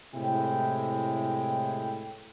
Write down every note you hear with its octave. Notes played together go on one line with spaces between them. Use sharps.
A2 C3 G#3 E4 G5